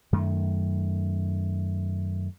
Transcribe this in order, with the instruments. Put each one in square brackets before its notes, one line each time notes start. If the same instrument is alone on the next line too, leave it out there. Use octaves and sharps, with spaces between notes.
[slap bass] F#2 D#3 A3